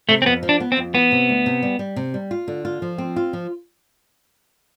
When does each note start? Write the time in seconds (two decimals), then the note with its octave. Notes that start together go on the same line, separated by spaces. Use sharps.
0.09 C3 A3
0.22 C4
0.26 F2 B3
0.43 F3
0.49 D4
0.60 B3
0.72 C4
0.77 F2
0.94 E3 B3
1.12 C3
1.29 D2
1.46 C3
1.63 G3
1.79 G3
1.96 C3
2.14 G3
2.31 F4
2.48 D3
2.65 F4
2.82 F3
2.98 C4
3.16 F4
3.33 F3